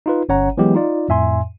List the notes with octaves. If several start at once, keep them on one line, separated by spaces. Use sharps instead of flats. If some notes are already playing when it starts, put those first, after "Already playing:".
D#4 F4 B4
G1 C#4 C#5 F#5 A#5
E3 F#3 G#3 B3 G4
D#4 F4 D5
F2 A2 E5 G#5 C6